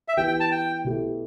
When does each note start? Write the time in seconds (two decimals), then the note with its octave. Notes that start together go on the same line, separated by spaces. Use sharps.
0.08 E5
0.17 E3 B3 G4 G5
0.28 G5
0.40 A5
0.51 G5
0.84 B2 A3 E4 G4